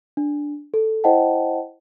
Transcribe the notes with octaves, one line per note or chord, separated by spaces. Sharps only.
D4
A4
E4 C5 D#5 F#5 G5 A5